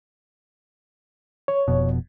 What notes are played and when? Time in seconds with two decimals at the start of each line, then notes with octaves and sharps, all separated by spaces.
1.48 C#5
1.68 F1 F2 B2